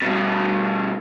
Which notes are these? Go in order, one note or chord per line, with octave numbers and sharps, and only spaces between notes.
G2 B2